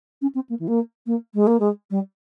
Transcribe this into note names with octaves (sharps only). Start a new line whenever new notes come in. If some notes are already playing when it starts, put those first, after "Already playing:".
C#4
C4
A#3
E3
A#3
A#3
G#3
A#3
G#3
G3